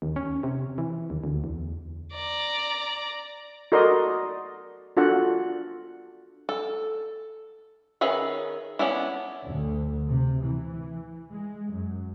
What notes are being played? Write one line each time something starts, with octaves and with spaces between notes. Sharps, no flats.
D#2
C#4
C3
E3
D#2
D2
E2
D5 A#5
F#4 A4 A#4 D5 D#5 C6
D4 F4 F#4 A4 F#5
A4
D#3 C#4 G#4 B4 E5
B3 C#4 D4 E4
D2
C3
E3
G#3
F#2